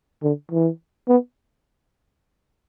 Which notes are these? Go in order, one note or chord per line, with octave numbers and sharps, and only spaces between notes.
D3
E3
B3